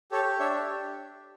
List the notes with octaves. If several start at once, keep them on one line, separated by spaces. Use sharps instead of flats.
G4 A4 C#5
D4 C#5 E5
G4